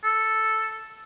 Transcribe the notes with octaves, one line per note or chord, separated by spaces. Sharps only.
A4